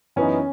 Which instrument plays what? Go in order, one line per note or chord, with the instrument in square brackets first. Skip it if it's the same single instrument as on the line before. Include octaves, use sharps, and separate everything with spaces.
[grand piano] F#2 E3 B3 D#4 [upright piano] C#4